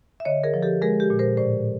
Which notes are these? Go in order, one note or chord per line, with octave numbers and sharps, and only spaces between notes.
E5
D3 C#5 D#5
G#4 A#4
F3
G4 A4
G#3 G#4 A#4
G4 A4
A#2
A#4 C5
A2 C5 D5